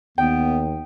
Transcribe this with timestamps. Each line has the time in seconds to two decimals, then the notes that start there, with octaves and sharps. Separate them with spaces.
0.18 D#2 B3 G5